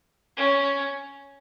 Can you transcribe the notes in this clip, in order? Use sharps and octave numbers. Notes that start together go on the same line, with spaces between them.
C#4